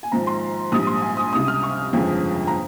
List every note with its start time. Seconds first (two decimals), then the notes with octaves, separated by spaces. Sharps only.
0.03 G#5
0.12 G#1 G#2 F3 A#5
0.27 C6
0.72 A#1 G#2 G3 D#6
0.87 C6
1.02 G#5
1.17 D#6
1.33 C#2 C3 G3 D#6
1.48 F6
1.63 C#6
1.93 G1 F2 C#3 F3 G#3
2.47 A#5